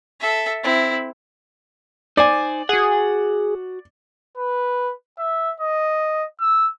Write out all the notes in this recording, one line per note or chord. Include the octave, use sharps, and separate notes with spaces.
A4 E5
C4 E4
D#4 C5 D5 G#5
F#4 G#4 F#5
B4
E5
D#5
E6